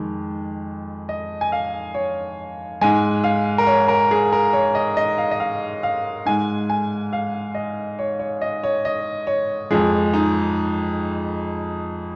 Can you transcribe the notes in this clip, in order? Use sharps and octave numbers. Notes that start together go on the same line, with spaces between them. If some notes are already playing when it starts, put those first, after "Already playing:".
Already playing: F2 D#3 G#3
D#5
G#5
F5
C#5
G#2 G#3 G#5
F5
A#4
C#5
A#4
G#4
A#4
C#5
D#5
D#5
F5
D#5
F5
F5
G#2 G#3 G#5
G#5
F5
D#5
C#5
C#5
D#5
C#5
D#5
C#5
F2 F3 G#3 G#4
D#4